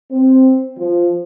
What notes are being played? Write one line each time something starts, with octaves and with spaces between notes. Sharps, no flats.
C4
F3